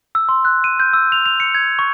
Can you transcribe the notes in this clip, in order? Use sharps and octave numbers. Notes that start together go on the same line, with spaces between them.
E6
C6
F#6
D#7
G6
E6
F7
F7
C#7
G#6
C#6